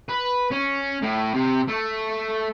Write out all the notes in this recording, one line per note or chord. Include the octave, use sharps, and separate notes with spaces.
B4
C#4
A2
C3
A3